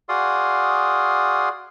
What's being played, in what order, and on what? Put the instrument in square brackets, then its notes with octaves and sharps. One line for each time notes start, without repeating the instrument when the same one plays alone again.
[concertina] F#4 G#4 D5 F5 C6 D#6